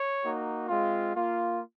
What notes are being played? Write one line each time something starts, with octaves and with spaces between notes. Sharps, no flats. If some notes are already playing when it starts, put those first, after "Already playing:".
Already playing: C#5
A#3 D#4 F#4
G#3 C4 F4
A#3 F4